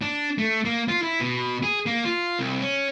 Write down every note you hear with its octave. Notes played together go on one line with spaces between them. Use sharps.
D4
A3
A#3
F4
E4
B2
G#4
A#3
F4
C2
C#4